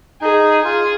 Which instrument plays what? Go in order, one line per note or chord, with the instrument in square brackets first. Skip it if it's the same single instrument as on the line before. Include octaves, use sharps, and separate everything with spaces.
[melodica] D#4 [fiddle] G#4
[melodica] F4 [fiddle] G#4